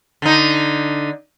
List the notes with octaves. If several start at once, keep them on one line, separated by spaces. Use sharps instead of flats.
D3 D#4